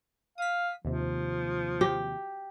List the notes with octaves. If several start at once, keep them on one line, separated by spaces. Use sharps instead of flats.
F5 D#6 B6
D#2 C3 F3
G4